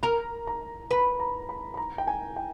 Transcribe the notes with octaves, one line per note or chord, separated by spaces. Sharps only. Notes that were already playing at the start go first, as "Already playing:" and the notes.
A#4 A#5
A#5
B4 B5
A#5
B5
B5
A#5
G5
G#5
G5